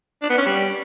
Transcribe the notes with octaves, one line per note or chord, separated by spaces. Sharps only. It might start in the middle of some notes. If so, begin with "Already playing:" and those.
D4
B3
C#4
G3